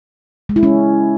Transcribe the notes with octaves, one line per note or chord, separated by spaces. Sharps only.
G#3
E4
C#4